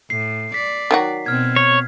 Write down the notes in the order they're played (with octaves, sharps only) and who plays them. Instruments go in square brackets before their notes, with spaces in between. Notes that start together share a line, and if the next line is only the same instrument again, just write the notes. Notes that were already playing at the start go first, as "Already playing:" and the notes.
[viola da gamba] A2 [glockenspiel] C7
[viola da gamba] D5 [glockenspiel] B6
[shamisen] D#3 F#3 F#4
[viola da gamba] B2 C4 [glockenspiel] F6 G#6
[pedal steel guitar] C#5